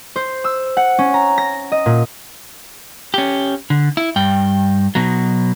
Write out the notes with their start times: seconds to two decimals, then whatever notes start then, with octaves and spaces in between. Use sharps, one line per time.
0.16 C5
0.44 E6
0.77 F#5
0.99 C#4
1.14 A#5
1.38 A#6
1.72 D#5
1.86 A#2
3.14 C#4 G4
3.70 D3
3.97 E4
4.16 G2 G5
4.95 B2 F#3